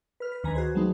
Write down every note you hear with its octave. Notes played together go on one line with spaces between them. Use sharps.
B4 F6
B4
D2 D#3 B4 G#5 A#5
F#4 G#4 C5
F#3 G3 A3 B3 D#4